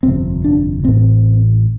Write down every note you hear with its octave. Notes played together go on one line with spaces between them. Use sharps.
G1 F2 C3 C4
D4
A1 A2 C4